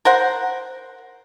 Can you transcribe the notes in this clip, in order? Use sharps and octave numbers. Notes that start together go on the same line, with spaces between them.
A#4 C5 F#5